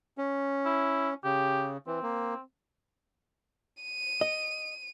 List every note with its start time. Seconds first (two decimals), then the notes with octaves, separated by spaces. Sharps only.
0.18 C#4
0.66 E4
1.24 C#3 G4
1.87 E3 C4
2.03 A#3
3.83 D#7
4.21 D#5